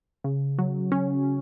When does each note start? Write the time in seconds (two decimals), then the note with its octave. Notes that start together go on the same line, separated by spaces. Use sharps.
0.24 C#3
0.59 F#3
0.92 C#4